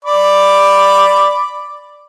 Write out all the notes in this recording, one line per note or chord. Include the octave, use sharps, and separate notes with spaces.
D5 B5 D6